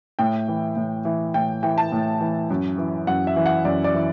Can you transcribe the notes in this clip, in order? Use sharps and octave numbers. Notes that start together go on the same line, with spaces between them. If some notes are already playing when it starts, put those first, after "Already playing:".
A2 G5
E3
A2
E3
A2 G5
E3 G5
A5
A2
E3
F#2
E3
F#2 F#5
E5
E3
F#5
F#2 D5
D5
E3